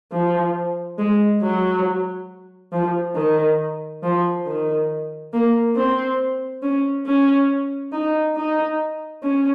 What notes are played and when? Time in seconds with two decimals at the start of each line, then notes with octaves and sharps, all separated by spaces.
0.12 F3
0.98 G#3
1.42 F#3
2.72 F3
3.15 D#3
4.03 F3
4.46 D#3
5.33 A#3
5.76 C4
6.63 C#4
7.07 C#4
7.92 D#4
8.36 D#4
9.24 C#4